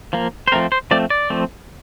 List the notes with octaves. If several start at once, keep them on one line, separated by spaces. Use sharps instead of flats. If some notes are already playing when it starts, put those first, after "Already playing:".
F3 A#3
C5
F3 A3 C4 A#4
C5
F3 A3 C4 D5
D5
F3 A3 C4